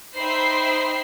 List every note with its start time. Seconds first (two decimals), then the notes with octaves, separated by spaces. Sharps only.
0.16 D#4 C5 E5 G5 B5 C7